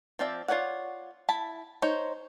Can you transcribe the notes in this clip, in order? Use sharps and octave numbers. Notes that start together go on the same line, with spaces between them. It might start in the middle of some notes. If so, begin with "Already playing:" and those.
F3 C4 D5 E5
F4 G#4 C#5 D5 F#5
E4 A5 B5
D#4 C5 C#5